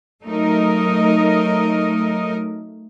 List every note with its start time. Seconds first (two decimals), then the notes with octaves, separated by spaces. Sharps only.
0.23 F#3 A3 D#4 A#4 D#5